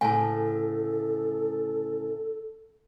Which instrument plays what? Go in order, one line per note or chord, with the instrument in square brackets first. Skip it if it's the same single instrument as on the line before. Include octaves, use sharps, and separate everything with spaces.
[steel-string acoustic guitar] D2 A2 C#3 [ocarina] A4 [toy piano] G#5 A5